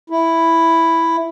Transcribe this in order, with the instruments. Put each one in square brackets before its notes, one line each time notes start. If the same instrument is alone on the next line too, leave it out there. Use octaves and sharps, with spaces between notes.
[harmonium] E4